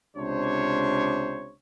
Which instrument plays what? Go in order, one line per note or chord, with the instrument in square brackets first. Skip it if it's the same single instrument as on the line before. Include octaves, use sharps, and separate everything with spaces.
[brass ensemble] C#2 C3 D4 C5 C#5